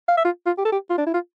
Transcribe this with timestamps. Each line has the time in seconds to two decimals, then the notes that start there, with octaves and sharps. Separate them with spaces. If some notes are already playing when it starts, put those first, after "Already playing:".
0.09 F5
0.17 E5
0.25 F4
0.46 F4
0.58 G4
0.65 A4
0.72 G4
0.90 F4
0.98 D4
1.06 E4
1.14 F4